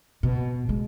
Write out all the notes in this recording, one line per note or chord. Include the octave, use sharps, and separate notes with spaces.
B2
G#3